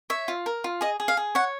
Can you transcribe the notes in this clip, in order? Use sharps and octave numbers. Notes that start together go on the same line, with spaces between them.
C#5 E5
F4
A#4
F4
G#4 D#5
G#4
F5
G#4
C#5 F#5